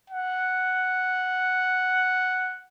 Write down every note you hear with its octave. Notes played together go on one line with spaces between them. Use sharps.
F#5